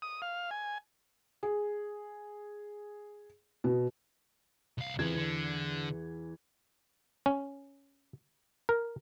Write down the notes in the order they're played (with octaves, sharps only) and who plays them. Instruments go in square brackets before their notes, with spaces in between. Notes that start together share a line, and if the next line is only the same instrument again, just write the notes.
[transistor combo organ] D#6
F5
G#5
[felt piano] G#4
B2
[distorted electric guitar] C2 F5
[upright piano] E2 E3 G#6 [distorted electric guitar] C4 F4
[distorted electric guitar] D3
[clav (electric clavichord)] C#4
A#4